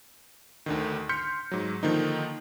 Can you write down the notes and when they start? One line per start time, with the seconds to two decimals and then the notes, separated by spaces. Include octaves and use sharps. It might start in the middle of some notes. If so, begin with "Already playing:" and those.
0.66 D2 D3 D#3
1.09 C6 F6 G6 B6 C#7
1.51 G#2 F#3
1.83 D3 D#3 F3 A#3 D#4